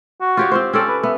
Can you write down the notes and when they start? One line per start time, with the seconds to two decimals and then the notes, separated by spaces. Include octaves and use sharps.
0.21 F#4
0.37 F4 G4 C#5
0.51 C4 F4 C5
0.73 C4 C#4 A4 D5
0.88 B4
1.03 B3 E5